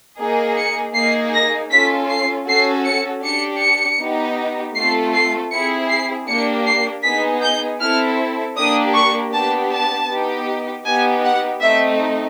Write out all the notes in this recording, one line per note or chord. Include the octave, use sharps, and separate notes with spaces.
A#3 D#4 G#4
C#7
A#3 D#4 G#4 C7
A#6
C#4 F4 A4 B6
C7
C#4 F#4 A4 C7
C#7
D4 G4 C#7
C#7
B3 D#4 G4
A3 C4 F4 A4 C7
C7
C4 E4 G#4 C#7
C7
A#3 D4 G4 C#7
C7
B3 D#4 G#4 B6
G6
C4 E4 A4 F6
A#3 D4 G4 D#6
C#6
B3 D4 G4 A5
A5
B3 D#4 G4
B3 D#4 G4 G#5
F#5
A3 C4 D#4 E5